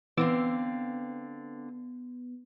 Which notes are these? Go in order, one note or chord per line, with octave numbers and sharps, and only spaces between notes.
D3 E3 B3 C4 F5 D6 E6